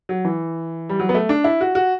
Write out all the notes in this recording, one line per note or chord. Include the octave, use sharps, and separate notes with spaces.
F#3
E3
G3
F#3
B3
A3
D4
E4
F#4
F#4